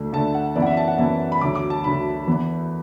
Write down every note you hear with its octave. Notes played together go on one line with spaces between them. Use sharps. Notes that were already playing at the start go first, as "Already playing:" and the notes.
Already playing: D2 D3 A3 D4
D2 D3 A3 D4 A5
F#5
F#2 E3 B3 E4 D5
F#5
E5
A5
F#5
F#2 E3 B3 E4 A5
B5
D2 D3 F#3 D6
D6
A5
D2 D3 F#3 B5
E2 E3 B3